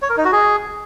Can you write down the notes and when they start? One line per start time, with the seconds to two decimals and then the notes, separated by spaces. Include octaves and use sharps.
0.02 C#5
0.10 A#4
0.17 D#4
0.25 F#4
0.32 G#4